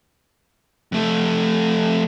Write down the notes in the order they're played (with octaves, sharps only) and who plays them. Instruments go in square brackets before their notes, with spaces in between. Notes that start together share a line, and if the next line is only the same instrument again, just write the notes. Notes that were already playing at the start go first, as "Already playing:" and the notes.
[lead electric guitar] F2 A3